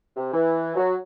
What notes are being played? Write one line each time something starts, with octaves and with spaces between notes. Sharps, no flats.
C3
E3
F#3